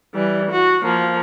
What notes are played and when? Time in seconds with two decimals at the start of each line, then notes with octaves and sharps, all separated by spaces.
0.14 E3 G3
0.51 F#4
0.84 F3 A#3